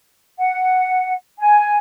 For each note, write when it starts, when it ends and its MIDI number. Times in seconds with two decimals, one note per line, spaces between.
0.39 1.14 78
1.38 1.77 80